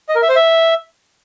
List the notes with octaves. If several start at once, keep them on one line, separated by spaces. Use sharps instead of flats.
D#5
A#4
E5
C5
E5